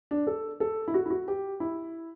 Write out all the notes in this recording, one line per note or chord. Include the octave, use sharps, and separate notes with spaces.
D4
A4
A4
E4
F#4
E4
F#4
G4
E4